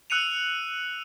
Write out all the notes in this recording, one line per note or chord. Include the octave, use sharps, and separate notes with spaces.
E6 F#6 C#7 D#7 F7